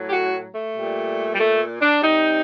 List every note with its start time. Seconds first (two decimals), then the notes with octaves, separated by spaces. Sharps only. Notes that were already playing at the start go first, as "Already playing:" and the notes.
Already playing: A2 F#3
0.08 G4
0.12 F#4
0.55 A3
0.75 A#2 G3
1.34 G3
1.39 A3
1.81 D4
2.02 C3 G3 D#4